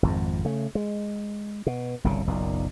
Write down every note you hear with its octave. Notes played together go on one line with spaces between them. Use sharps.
G#1 F2 G#2
C#3 A3
G#3
B2
G1 C2 A#2 C#3
F#1 B1 A#2